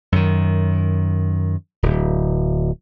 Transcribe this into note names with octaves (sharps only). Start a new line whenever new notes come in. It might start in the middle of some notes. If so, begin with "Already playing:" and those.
F#2 D#3
D1